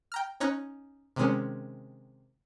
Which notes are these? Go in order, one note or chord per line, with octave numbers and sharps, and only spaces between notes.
G5 A#5 F6
C#4 D#4 C#5 A#5 F#6
C3 D#3 G#3 C#4